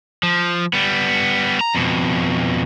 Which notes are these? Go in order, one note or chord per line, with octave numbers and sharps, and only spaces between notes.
F3
G3 B3
A#5
F2 B2